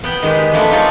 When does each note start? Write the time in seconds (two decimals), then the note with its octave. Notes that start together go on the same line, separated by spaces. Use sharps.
0.04 B3 G5 B5
0.22 D#3 G#3 G4 B4
0.53 F2 F3 A3 D4 B4
0.71 D#4 F4 G#4 A4 C#5 D5